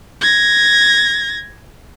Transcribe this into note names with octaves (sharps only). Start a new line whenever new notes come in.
G#6 A#6